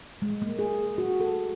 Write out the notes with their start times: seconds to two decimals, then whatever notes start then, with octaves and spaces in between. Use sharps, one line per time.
0.22 G#3
0.42 A#3
0.59 G#4
0.98 F#4
1.20 A4